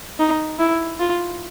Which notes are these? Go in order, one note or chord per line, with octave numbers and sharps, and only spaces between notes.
D#4
E4
F4